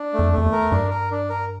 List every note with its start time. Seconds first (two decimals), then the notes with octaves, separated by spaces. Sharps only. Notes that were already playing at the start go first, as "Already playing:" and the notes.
Already playing: D4
0.13 A3
0.19 F2
0.32 A3
0.38 F2
0.46 E2
0.52 A#4
0.72 G2 D4
0.91 A#4
1.11 D4
1.30 A#4